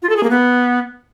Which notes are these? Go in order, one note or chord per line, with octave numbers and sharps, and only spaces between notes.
F4
A4
G#4
A#3
B3